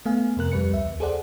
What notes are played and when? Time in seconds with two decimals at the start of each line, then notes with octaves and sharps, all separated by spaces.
0.06 A3 B3 F5 G#5
0.37 F2 C3 A#4 F#6
0.52 F2 G3 B4 C#7
0.72 C#2 E5
0.86 E2
1.00 G#4 A4 C5 D5 F#5